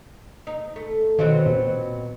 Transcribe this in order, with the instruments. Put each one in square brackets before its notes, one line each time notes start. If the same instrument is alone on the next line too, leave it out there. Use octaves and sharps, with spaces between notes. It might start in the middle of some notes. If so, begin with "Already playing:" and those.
[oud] D#4
A3
[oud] B2 F#3 C4 [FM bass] D#3
[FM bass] A#2